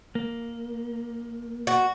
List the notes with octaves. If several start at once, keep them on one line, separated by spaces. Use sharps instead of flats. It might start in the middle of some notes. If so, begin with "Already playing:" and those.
A#3
F#4